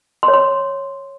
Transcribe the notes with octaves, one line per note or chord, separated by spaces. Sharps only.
C6
C#5
C6